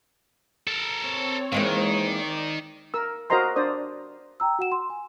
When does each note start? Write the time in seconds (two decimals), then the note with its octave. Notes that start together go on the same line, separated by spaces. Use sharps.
0.68 A4 A#4
1.06 C4 C#5
1.52 D#3 E3 G#3 A#3
2.09 D5
2.94 A#4 E6
3.30 F#4 A#4 C5 D#5 A#5 C6
3.56 D4 C5 D5 D#6
4.40 G5 A#5 E6
4.59 F#4 F#5 E7
4.72 C6
4.90 G#5